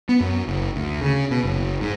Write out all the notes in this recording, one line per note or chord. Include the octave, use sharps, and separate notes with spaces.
B3
F#2
F#1
D2
C#3
B2
F#1
G#2